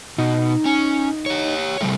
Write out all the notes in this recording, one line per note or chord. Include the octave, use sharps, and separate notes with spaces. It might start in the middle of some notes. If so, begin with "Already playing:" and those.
B2 D#4
C#4
G4 C#5
C3 G3 A3